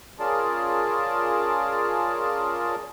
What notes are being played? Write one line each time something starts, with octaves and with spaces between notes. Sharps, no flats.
C#4 F4 G#4 A#4 D5 A5